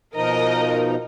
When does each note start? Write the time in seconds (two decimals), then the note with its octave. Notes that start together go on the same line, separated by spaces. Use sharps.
0.15 B2 F3 D#4 A#4 D#5